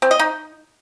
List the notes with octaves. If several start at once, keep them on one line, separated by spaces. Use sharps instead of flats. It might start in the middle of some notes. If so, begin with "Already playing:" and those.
C4
D#5
D#4